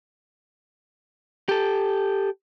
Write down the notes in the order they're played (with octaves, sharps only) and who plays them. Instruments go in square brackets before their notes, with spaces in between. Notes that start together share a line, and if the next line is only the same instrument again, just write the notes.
[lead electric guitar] G4 A4